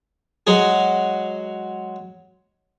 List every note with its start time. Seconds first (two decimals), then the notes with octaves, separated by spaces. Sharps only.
0.47 F#3 G#3 G#4